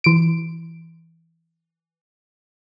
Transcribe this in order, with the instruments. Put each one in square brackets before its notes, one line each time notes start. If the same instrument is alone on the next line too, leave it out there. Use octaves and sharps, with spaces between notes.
[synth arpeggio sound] E3 D7